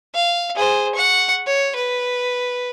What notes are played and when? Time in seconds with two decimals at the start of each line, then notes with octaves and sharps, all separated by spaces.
0.15 F5
0.56 G#4 C5
0.95 F#5 C#6
1.47 C#5
1.76 B4